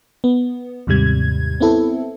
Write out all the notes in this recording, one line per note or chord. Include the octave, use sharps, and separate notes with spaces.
B3
D#2 G#2 C3 G3 G#6
B3 C4 E4 A4